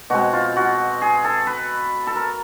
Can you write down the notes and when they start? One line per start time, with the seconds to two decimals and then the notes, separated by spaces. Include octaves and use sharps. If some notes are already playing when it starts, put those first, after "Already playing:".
0.10 B2 G#3 C4 F#4
0.33 F4
0.56 F#4
1.02 G#4
1.24 A4
1.47 B4
2.07 A4
2.16 A#4